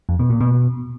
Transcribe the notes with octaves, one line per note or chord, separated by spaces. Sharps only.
F2
B2
A#2
B2